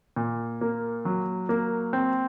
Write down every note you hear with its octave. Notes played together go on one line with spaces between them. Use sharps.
A#2
A#3
F#3
A#3
C4